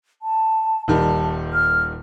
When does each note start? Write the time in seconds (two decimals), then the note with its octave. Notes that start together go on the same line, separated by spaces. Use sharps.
0.22 A5
0.88 D#1 D#3 G3 A5
1.53 F6